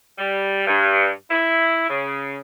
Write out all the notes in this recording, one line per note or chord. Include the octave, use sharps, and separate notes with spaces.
G3
G2
E4
C#3